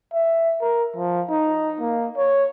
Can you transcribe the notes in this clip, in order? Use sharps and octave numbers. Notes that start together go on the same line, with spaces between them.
E5
A#4
F3
D#4
A#3
C#5